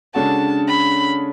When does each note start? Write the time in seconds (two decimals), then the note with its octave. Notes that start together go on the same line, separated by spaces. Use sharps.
0.14 C#3 G#3 D4 F#4 A4 A5
0.67 B5